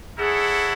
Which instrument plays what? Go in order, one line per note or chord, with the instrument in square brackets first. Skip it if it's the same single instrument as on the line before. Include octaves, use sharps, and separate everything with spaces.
[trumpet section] E4 A4 C#5 F#5 [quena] G#4